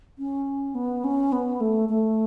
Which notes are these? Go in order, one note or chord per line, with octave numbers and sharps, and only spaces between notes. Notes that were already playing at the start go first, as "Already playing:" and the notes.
C#4
B3
C#4
B3
A3
A3